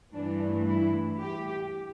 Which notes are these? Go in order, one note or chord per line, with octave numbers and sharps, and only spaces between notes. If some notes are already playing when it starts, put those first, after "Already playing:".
G2 E3 A3 D4
E4
G4